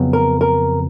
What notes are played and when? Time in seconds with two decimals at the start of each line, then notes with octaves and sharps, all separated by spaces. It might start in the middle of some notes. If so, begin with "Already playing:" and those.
Already playing: F2 C#3 F#3 B3
0.13 A#4
0.41 A#4